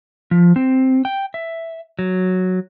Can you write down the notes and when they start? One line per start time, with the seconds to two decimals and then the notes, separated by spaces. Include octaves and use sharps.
0.31 F3
0.56 C4
1.05 G5
1.34 E5
1.99 F#3